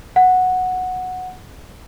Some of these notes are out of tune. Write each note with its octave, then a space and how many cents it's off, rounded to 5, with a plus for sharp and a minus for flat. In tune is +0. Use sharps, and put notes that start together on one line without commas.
F#5 -5